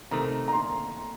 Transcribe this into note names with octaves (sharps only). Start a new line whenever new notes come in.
C3 D#3 A3 A#5
A#5
C6